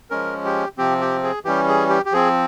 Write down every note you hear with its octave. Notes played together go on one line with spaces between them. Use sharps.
F3 G#3 C#4 A#4
G4
C3 F3 C4 G4
G4
G#4
E3 G3 C#4 G4
G#4
G4
G4
F3 C4 G#4